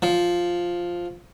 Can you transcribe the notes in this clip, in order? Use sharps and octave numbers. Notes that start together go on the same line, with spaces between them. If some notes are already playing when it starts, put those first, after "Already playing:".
F3